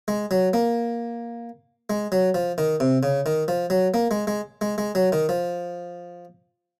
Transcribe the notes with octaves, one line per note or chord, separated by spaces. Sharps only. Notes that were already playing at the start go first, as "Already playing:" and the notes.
G#3
F#3
A#3
G#3
F#3
F3
D#3
C3
C#3
D#3
F3
F#3
A#3
G#3
G#3
G#3
G#3
F#3
D#3
F3